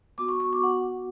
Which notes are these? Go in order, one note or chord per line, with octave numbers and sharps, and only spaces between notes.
B3 F#4 D6
C#6
C#6
D6
F#5